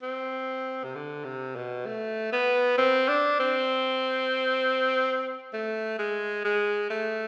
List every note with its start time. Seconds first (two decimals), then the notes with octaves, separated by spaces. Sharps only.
0.03 C4
0.84 C3
0.95 D3
1.25 C3
1.56 B2
1.86 A3
2.33 B3
2.78 C4
3.08 D4
3.40 C4
5.53 A3
5.99 G#3
6.45 G#3
6.90 A3